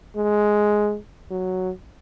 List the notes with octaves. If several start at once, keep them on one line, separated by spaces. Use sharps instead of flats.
G#3
F#3